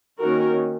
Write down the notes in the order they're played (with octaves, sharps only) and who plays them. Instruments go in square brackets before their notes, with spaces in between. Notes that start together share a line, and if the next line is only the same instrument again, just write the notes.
[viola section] D#3 A#3 C#4 F#4 A#4